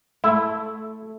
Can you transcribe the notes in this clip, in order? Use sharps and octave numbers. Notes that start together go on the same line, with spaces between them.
A3 E4